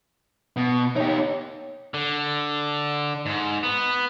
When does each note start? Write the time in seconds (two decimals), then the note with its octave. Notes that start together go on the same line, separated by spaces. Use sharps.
0.57 B2
0.96 D#4 G4 C#5
1.94 D3
3.26 G#2
3.63 B3